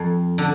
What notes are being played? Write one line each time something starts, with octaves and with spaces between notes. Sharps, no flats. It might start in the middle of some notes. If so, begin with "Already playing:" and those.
Already playing: F2
D3